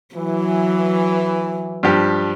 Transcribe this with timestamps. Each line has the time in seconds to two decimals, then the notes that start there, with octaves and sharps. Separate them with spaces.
0.15 E3 F#3
1.83 G2 F3 G4